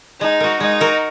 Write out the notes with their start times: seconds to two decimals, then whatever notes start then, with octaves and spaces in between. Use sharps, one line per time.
0.20 G#3 D#4
0.40 F#4 A#4
0.60 G#3 D#4
0.80 F#4 A#4